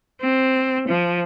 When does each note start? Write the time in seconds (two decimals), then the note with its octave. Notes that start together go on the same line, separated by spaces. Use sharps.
0.21 C4
0.88 F3